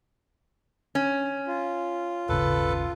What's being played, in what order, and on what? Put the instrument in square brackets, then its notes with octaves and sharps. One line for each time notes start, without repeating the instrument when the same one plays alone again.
[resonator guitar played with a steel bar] C#4
[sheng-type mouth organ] F4
[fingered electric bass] D#1 G#1 C#3 [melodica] A4 B4